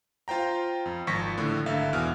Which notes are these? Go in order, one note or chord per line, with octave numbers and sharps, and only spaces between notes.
F4 C5 G5 A#5
F2
G#1 F3 C#6 A#6 B6
A2 D3
G#1 D3 E5 F5
E2 B2 F6